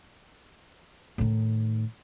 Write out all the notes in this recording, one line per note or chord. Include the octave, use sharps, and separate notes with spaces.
A2 D#3